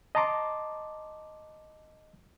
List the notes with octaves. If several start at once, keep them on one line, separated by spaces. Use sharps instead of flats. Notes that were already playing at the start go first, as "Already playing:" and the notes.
D#5 A5 A#5 C6 D6